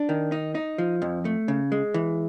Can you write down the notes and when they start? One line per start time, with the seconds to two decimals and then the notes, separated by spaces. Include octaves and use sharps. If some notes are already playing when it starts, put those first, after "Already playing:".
Already playing: D4
0.09 D#3
0.32 D#4
0.55 D#4
0.78 F3
1.02 F2
1.25 A3
1.48 C#3
1.72 G#3
1.94 E3